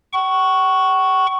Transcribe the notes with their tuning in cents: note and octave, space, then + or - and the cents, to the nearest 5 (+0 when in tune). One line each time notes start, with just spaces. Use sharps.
F#5 +45 C#6 +0